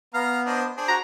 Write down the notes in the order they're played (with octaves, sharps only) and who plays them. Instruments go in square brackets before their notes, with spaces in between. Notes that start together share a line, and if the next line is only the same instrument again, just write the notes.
[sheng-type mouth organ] B3 [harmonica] F5 A#5
[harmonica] D4 C5 D#5
D4 G#4 C5
[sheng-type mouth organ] F#4 [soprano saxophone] A#5